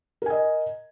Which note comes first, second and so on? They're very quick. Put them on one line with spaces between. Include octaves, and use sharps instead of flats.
A#4 G#5 D#5